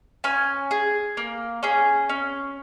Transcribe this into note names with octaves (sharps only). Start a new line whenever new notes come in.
C#4 G#5
G#4
A#3
C#4 G#4
C#4